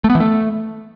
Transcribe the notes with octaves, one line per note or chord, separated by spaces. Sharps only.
A3
B3
E3
A3